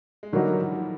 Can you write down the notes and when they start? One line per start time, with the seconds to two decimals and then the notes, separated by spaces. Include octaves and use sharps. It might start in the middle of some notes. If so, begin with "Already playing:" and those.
0.23 G#3
0.32 D3 F#3 G3 A#3 D#4 F#4
0.54 D#3
0.63 E3
0.72 F3